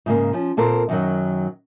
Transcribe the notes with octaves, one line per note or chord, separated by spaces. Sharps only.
G#2 C#3 A#3
F3 C#4
A#2 C4 A4 A#4 C5
F#2 D#3 F#3